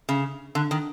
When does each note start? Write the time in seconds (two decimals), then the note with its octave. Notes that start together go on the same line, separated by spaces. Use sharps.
0.09 C#3
0.55 D3
0.71 D#3